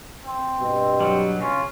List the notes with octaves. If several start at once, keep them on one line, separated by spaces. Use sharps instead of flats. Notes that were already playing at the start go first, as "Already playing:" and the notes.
C4
G2 B2
F#3 G3
C#3 C#4 F4